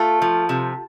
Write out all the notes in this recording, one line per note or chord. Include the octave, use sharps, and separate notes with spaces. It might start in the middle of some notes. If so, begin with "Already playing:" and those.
Already playing: A3 F4 A4
F3
C3